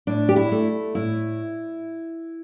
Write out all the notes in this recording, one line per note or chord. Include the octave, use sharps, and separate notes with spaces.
A2 D4
G4
E4
A3
A2 E4